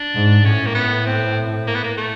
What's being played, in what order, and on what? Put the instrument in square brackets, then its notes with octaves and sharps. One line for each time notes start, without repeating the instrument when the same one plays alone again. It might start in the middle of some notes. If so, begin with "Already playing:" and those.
Already playing: [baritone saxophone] D4
[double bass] G#2
[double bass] A2 [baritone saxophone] C#4
[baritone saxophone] A#3
B3
C4
A#3
B3
A#3
A3